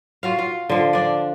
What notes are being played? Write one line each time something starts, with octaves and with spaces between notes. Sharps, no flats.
F4 F#4 F5
F4
D3 F3
D4 D5